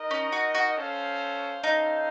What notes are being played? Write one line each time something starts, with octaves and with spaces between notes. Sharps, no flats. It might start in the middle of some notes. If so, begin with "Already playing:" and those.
Already playing: D#4 A#4 D#5
C#4
F#4
F#4
C#4 A4 C5 F5
C#4 D#4 A4 C5 F5